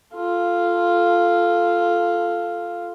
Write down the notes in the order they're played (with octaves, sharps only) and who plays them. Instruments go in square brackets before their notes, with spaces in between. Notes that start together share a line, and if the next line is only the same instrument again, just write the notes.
[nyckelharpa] F4 A4